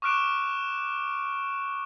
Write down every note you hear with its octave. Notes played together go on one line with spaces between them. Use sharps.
C#6 D6 F6 F#6 D7 E7